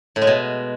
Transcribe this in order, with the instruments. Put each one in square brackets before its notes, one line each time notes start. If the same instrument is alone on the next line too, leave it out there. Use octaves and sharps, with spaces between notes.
[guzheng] A2
G#3
B2